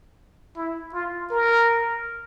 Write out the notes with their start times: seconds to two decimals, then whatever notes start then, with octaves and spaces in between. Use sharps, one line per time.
0.56 E4
0.94 F4
1.31 A#4